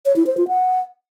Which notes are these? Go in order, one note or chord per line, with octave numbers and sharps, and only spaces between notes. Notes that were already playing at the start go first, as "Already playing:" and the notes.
C#5
E4
C5
F4
F#5